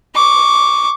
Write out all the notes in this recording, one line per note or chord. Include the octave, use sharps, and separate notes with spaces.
C#6 D6